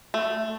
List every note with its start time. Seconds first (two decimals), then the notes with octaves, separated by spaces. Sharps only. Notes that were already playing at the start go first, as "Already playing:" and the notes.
0.14 A3